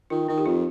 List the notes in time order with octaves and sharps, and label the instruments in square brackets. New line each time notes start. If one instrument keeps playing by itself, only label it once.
[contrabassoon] D#3 [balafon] F4
[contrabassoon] D#3 [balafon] D#4
[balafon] G4
[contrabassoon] F2 [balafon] F4